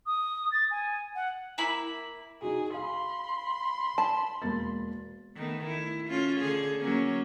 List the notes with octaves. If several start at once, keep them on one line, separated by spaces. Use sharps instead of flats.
D#6
A6
G#5
F#5
A#3 E4 B5
D#4 F#4 G#4
F5 B5 C6
A5
E1 A#3 A6
D#3 A3 B3
E4
A3 C#4 F4
D3 G#4
F#3 A#3 C#4